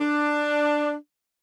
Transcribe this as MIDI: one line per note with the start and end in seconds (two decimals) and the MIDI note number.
0.01 0.95 62